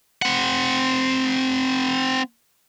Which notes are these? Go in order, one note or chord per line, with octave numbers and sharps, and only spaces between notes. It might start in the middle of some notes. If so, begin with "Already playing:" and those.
C4 F#5